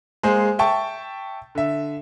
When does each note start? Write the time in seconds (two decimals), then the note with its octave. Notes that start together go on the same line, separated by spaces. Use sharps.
0.23 G#3 A#3 G#4 C5
0.59 E5 G5 A5 C#6
1.55 D3 E5